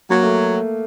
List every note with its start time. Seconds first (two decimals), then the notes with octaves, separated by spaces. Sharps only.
0.10 F#3 A#3
0.23 A3